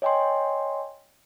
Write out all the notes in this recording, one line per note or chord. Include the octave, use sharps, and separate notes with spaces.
C#5 D#5 G5 G#5 C6